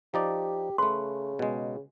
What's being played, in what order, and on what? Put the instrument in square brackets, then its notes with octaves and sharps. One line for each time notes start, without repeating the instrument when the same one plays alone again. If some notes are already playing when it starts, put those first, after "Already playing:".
[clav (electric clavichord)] F3 D#4 D5 [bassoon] G4
[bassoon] C#3 [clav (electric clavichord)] A3 B4 [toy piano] C6
[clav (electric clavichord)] B2 G#3